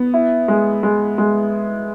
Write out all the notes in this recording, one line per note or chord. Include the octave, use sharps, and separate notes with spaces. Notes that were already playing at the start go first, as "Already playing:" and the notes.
Already playing: B3
E4
G#3
G#3
G#3